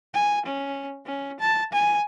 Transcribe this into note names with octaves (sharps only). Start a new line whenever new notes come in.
G#5
C#4
C#4
A5
G#5